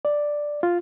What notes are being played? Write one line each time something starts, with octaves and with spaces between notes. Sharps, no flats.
D5
F4